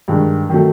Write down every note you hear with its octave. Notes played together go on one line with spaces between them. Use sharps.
G2 D#3 G#3
D#3 F#3 A3